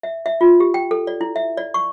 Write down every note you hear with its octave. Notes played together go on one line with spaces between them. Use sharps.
E5
E5
F4
G4
G5
A4
D5
E4
E5
D5
C#6